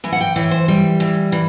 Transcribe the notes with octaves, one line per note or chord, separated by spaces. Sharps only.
E3 G#5
F#5
G5
E3 C#5
C5
G3
E3
E3